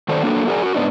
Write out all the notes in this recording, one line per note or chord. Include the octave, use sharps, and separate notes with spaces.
D#3 F#3 A4 C5 D5
F#3 A#3 D4 A4
F#4 G#4 A#4 D5 G#5
F#4 A#4
G#2 B3 D4 D#4